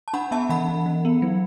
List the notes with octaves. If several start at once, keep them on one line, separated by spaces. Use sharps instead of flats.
A5
D4 F#5 B5
B3 E5 A5
E3 F#5 B5
E3
E3
B3
F#3